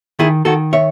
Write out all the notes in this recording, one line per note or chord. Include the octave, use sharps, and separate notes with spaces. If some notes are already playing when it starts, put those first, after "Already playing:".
D#3 E4 G#4
D#3 F#4 A4
C#5 E5